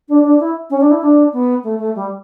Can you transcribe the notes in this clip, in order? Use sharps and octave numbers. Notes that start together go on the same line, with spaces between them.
D4
D4
E4
C#4
D4
E4
D4
B3
A3
A3
G3